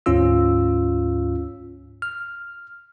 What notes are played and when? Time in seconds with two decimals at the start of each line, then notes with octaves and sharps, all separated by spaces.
0.06 D2 G#2 C#4 F4 E6
2.02 F6